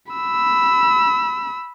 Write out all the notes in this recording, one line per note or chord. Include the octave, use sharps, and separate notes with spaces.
B5 E6